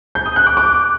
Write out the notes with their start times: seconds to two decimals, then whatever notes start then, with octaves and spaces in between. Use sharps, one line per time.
0.15 G6
0.26 D#6
0.36 F#6
0.47 D6
0.57 D6